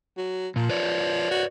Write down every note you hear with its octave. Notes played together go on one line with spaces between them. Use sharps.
F#3
A#2 F3
B4 C#5 D5
F#4